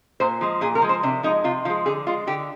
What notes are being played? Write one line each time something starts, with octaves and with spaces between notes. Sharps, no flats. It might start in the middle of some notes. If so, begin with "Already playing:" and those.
A#2 C5
F3 G#3
A#2 G#4
A#4
F3 G#3
C5
C3 D4
F3 G#3 D#4
C3 F4
F3 G#3 F4
D3 G#4
G#3 F4
D3 G4